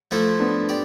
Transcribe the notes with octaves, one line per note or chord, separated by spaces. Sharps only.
F3 A3 E4 A4 C5
B3 D4
G4 D5